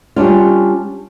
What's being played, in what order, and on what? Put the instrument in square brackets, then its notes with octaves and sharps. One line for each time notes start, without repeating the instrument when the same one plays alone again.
[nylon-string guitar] G3 C#4 D4 F4